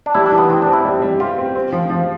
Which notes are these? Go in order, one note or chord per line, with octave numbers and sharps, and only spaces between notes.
D4
G3 E4
D4
E3
B3
E3 C4
C4 D4
E4
G3
G3
F4 G4
C4
C4
F3
F3